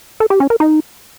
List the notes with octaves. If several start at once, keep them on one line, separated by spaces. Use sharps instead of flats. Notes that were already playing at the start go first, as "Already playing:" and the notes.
A4
G4
C#4
A#4
D#4